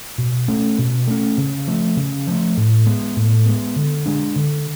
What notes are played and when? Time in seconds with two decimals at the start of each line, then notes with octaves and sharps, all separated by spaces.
0.18 B2
0.48 A3 C#4
0.78 B2
1.08 A3 C#4
1.38 C#3
1.67 F3 A3
1.97 C#3
2.27 F3 A3
2.57 A2
2.87 G#3 B3
3.17 A2
3.46 G#3 B3
3.76 D3
4.06 G#3 D4
4.36 D3